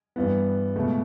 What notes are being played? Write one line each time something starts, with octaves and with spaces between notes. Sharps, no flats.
G2 E3 B3
C#2 B2 A3